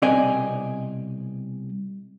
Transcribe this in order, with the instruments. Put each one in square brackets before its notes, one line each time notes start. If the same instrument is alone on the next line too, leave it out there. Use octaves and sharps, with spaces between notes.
[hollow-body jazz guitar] C2 B2 C4 D5 D#5 G#5